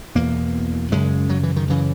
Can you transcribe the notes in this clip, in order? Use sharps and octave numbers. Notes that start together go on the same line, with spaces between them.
E2 B2 A#3
F#2 C#3 G#3
F#3
E3
D#3
F#2 C#3 E3